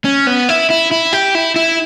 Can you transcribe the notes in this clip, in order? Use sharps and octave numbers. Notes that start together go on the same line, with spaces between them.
C#4
B3
E4
E4
E4
G4
E4
E4